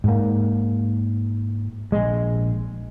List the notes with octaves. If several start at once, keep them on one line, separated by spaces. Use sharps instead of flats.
G#2 A#3
A#1 G#3